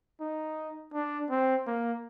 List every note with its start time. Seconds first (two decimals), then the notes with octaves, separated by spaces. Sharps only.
0.20 D#4
0.93 D4
1.30 C4
1.67 A#3